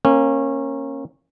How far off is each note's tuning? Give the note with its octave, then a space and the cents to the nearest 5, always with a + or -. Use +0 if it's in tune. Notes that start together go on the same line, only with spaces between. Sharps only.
A#3 +0 C#4 -25